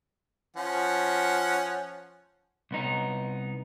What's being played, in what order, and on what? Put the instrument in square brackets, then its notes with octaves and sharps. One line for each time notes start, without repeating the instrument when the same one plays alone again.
[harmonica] F3 C#4 F#5
[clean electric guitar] C2 B3 D#4